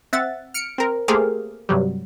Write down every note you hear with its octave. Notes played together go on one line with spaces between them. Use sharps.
C4 E5 F#5 A6
F6 C#7 D7
C4 A#4
A3 A#3 C4 G4 G#4 F5
G2 C3 F#3 G3